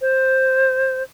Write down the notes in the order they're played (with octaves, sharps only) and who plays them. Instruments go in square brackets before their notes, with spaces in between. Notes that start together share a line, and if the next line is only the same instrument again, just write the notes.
[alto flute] C5